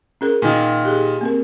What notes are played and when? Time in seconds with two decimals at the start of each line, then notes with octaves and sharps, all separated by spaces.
0.21 C#4 G#4 A#4
0.42 A#2 D#3
0.85 G4 G#4
1.21 A#3 C4 A#4